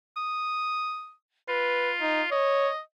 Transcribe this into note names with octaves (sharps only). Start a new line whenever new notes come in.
D#6
F4 B4
D#4
C#5 D#5